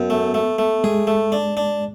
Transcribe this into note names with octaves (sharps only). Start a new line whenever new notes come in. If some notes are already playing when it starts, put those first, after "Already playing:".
Already playing: F#2 B3
A3
A3
A3
G#3 G#4
A3
D4
D4